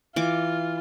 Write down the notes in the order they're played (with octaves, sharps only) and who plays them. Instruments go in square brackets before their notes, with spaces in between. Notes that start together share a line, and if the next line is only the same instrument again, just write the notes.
[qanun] E3 D6 [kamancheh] F4